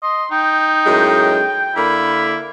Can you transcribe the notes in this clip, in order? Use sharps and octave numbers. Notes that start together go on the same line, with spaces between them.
D#5 C6
D#4 G5
F#2 A2 G#3
D3 A#3 E4 B5